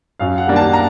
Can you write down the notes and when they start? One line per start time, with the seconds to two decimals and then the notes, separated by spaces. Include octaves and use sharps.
0.19 F#2 F5
0.38 F#5
0.47 D#3 G3 A#3 D4
0.56 A5
0.73 A#5